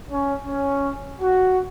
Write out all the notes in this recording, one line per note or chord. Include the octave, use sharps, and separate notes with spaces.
C#4
C#4
F#4